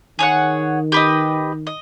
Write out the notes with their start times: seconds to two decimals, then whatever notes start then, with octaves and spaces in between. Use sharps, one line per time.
0.18 D#3 G#4 C#5 F#5
0.92 G4 B4 D#5
1.67 D#5